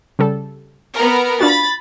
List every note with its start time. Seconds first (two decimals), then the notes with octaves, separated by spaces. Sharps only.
0.19 C#3 G3 A4
0.94 B3 A#4
1.41 D4 F4 F#4 B5 A6